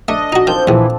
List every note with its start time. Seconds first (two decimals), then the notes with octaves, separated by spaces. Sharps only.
0.08 A3 D4 A4 D#5
0.32 D#4 F#4
0.47 D#3 F3 C4 G6
0.67 A#1 D#2 E3